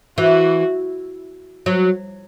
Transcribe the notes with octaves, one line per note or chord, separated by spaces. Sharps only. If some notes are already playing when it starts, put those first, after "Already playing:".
E3 F#4
F#3